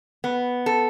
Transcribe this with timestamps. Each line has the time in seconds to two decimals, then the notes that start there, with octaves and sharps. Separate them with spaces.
0.24 B3
0.66 A4